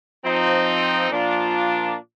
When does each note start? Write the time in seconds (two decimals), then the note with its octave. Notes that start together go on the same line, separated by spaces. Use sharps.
0.24 F3 C4 D#4
1.09 A#2 F3 A#3 D4 F4